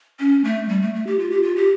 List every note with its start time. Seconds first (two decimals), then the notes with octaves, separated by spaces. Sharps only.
0.20 C#4
0.44 A3
0.69 G3
0.82 A3
0.95 A3
1.07 G4
1.19 F4
1.31 G4
1.43 F4
1.56 G4